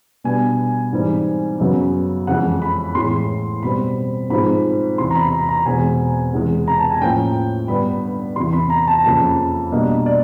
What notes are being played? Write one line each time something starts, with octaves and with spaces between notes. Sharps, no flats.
B2 G3 B3 D4 G#5
G#2 E3 G3 C4
F#2 C#3 F#3 B3
F2 C#3 E3 G#3 C#4 F#5
B5
A2 E3 G#3 C6
B2 G3 C4 B5
G#2 F3 G#3 C4 B5
E2 C3 E3 C6
A#5
B5
A#5
A#5
E2 B2 G#3 C4 G#5
E2 C3 E3 G#3
A#5
A5
G#5
A2 F3 A#3 C#4 G5
G2 D3 G3 B3 B5
E2 C3 E3 C6
B5
A#5
A5
F2 C#3 F3 A#3 A5
B2 G3 A#3 D4 D#5
D5